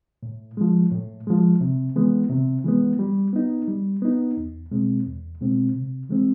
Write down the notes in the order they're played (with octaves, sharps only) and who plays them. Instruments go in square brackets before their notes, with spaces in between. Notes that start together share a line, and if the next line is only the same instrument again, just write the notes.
[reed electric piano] A2
F3 G#3
A2
F3 G#3
C3
E3 G#3 B3
C3
E3 G#3 B3
G3
B3 D#4
G3
B3 D#4
E2
B2 G#3 C4
E2
B2 G#3 C4
C3
E3 G#3 C4